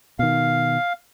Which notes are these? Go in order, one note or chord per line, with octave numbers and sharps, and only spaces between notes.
B2 D#3 F5